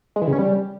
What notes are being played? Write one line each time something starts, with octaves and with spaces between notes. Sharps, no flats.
G#3
E3
C#3
C#4
G3